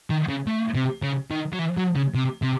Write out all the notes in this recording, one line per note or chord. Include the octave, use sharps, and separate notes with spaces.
D#3
C#3
A3
C3
C#3
D#3
F#3
E3
F#3
C#3
C3
C3